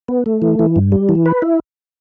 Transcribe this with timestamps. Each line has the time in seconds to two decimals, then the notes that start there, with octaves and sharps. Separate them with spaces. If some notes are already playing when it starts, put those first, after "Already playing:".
0.08 B3
0.26 A3
0.42 E3
0.59 E3
0.76 G2
0.92 G3
1.09 E3
1.26 B4
1.42 E4